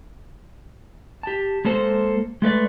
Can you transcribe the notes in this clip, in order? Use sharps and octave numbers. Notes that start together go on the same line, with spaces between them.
G4 A5
G#3 A#3 A4 C5
G#3 A3 B4 D5